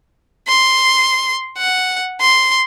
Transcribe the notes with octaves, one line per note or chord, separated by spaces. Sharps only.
C6
F#5
C6